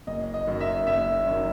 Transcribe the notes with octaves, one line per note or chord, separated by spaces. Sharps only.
F#1 D#5
D#5
F#2 D#3
E5
F#1 E5
F#2 D#3